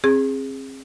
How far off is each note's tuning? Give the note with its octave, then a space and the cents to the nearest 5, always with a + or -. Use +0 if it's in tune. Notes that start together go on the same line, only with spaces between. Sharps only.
C4 +35 G#4 -15